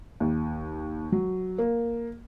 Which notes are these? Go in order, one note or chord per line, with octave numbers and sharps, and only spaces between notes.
D#2
F#3
A#3